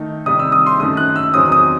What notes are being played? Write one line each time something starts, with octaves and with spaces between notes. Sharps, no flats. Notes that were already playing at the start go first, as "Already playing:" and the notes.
Already playing: D#3 A3 D#4
C3 D#3 G3 D#4 D#6
E6
D#6
C6
F#2 D#3 A3 D#6
F#6
E6
E2 D#3 F#3 C4 D#6
D#6